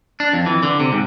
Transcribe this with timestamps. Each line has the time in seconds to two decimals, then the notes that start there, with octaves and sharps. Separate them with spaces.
0.20 D4
0.33 F2
0.46 E3
0.63 D3
0.80 C3
0.92 G#2